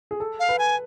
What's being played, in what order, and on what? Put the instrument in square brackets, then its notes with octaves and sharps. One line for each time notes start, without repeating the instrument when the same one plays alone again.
[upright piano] G#4
A4
[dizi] F5
[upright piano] B4
[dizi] G#5